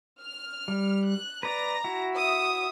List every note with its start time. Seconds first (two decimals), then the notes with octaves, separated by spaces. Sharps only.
0.19 F6
0.68 G3
1.06 F#6
1.43 B4 D5 A#5 A#6
1.84 E4 F#4
2.17 E5 D#6